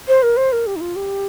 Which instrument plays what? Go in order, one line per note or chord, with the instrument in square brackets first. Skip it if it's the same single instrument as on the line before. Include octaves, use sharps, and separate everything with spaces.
[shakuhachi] C5
A#4
C5
A#4
G4
D#4
F4
G4